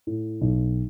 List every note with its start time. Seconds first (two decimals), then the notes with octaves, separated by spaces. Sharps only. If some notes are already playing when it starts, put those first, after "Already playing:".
0.07 A2
0.41 B1